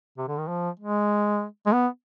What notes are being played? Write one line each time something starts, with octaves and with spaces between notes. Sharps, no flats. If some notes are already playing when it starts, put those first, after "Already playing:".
C3
D3
D#3
F3
G#3
G#3
B3